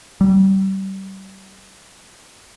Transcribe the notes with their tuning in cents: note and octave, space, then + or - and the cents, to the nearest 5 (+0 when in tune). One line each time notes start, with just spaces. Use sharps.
G3 -30